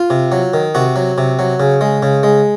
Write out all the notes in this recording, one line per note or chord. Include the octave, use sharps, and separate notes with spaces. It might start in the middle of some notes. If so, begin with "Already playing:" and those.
Already playing: F4
C3
F#3
D#3
C3 F#4
F#3
C3
F#3
C#3
G#3
C#3
G#3